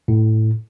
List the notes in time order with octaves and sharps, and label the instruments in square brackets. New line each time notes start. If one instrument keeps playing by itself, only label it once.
[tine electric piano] A2